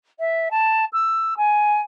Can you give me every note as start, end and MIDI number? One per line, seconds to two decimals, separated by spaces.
0.19 0.48 76
0.51 0.85 81
0.93 1.34 88
1.37 1.81 80